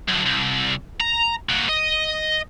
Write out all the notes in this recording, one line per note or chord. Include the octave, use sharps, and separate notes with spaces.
F#2 D3
C2
A#5
A#3 F#4
D#5